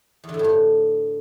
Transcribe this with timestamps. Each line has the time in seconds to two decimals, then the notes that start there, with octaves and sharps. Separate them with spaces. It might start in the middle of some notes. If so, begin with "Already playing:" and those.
0.24 E2
0.29 D3
0.34 A2
0.39 G2
0.44 A2